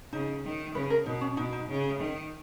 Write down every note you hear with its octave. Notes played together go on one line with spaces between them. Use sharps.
C#3 D#4
D#3
C#3 B4
A#4
B2 D#4
C#4
B2 D#4
D#4
C#3
D#3